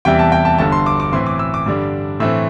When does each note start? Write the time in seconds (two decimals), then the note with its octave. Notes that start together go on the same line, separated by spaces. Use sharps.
0.05 E2 C3 E3 G3 E4 G5
0.19 A5
0.32 G5
0.45 A5
0.58 G1 G2 D3 A5
0.72 C6
0.86 D6
1.00 D6
1.13 A2 E3 C4 E4 C6
1.26 D6
1.39 E6
1.54 D6
1.66 G2 D3 G3 D4
2.20 A2 E3 A3 C4 E6